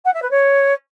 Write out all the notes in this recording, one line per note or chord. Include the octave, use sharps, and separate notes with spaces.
F#5
E5
B4
C#5